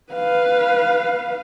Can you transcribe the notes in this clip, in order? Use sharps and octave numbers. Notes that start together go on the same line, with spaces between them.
B4 F5